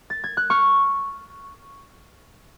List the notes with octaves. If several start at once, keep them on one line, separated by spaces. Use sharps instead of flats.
A6
G#6
F#6
C#6 F6